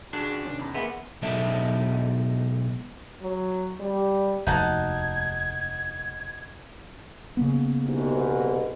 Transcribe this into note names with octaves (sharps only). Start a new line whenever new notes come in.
C#2 D4 F#4 G#4
C3 D#3 C#4
E2 B5
A#3 B3 G#4 E5 C6
B2 F#3 G#3 D#4 A4 E5
F#3
G3
F1 D#2 D#4 F#4 A5 G#6
C#3 A#3 B3
C2 G#2 B2